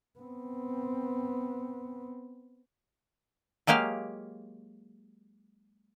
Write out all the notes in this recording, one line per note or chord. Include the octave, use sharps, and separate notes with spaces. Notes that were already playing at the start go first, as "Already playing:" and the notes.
B3 C4
F#3 G#3 A#3 G4 F5